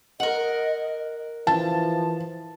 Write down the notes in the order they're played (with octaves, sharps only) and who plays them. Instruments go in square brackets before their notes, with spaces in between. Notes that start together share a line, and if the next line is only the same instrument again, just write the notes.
[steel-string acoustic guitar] A#4 F#5 [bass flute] D#5
[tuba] E3 [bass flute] F3 [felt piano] A5